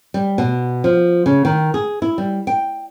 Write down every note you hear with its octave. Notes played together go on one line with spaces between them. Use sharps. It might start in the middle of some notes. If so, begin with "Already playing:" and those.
G3
B2
F3
C#3
D#3
G#4
E4
G3
G5